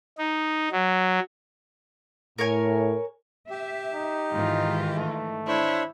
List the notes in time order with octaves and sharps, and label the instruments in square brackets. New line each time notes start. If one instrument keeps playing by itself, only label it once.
[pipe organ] D#4
F#3
[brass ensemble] A2 [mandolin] A#4 C#5 G#5
[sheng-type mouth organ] G4 [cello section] E5
[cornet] D#4
[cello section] G#2 D#3 E3 [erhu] F4
[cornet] A3
[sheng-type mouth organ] D4 C5 C#5 [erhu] E4